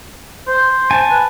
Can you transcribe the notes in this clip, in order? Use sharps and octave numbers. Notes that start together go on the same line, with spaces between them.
C5
G#5 A5
B4